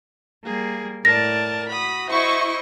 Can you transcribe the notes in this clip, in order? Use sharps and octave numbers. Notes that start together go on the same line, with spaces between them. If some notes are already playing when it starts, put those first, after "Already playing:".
G3 A#3 G#4
A2 A#4 D5 A5 A#6
F#4 B5 D#6
E4 C5 D#5 C#6